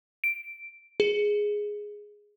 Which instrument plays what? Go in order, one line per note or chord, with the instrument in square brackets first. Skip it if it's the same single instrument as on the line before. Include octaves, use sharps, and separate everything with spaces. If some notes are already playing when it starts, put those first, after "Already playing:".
[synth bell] D7
G#4